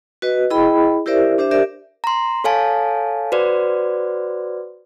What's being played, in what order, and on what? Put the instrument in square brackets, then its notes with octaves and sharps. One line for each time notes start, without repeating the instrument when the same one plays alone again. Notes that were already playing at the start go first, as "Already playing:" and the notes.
[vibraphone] F#4 B4 D#5
E4 G#4 D#5 G5 B5
E4 G4 A#4 C5 D5 E5
D4 G4 C5 E5
G4 A#4 D5 E5
[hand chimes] A#5 C6
A4 C#5 F5 G#5 A5
F#4 B4 C5 D5